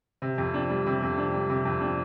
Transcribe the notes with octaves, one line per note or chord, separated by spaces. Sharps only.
C3
F2
D4
G3
C3
F2
D4
G3
C3
F2
D4